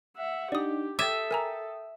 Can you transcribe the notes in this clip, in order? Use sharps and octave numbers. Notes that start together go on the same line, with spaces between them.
E5 F#5
D4 D#4 G4 D5 D#6
A4 E5 G5 D6 D#6 G#6 A6
A#4 G#5 A#5